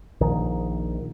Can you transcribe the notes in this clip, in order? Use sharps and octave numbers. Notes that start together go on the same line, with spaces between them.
A#1 D#3